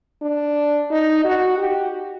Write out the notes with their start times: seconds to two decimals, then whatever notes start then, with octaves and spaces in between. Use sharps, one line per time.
0.22 D4
0.90 D#4
1.25 F#4
1.58 G4